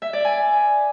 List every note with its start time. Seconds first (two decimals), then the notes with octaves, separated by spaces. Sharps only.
0.02 E5
0.13 D5
0.25 G#5